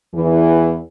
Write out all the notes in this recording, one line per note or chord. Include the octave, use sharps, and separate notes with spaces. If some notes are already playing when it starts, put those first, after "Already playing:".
E2 E3